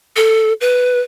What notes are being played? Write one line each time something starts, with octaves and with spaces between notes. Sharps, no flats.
A4
B4